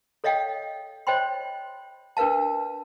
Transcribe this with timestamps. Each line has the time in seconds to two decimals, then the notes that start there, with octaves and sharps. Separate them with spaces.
0.24 A4 C#5 D#5 F5 G5
1.07 C5 C#5 D#5 G5 B5 C6
2.17 D4 A#4 B4 F5 A5